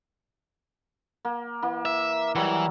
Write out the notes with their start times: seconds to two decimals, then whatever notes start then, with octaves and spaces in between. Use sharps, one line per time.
1.25 A#3
1.62 E3 A#3
1.85 E5
2.35 E3 F#3 G3